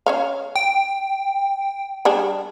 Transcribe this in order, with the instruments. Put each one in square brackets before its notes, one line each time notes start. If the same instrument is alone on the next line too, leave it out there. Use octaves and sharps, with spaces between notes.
[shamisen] C#4 C#5 F5
[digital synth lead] G5
[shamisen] G3 D4 G#4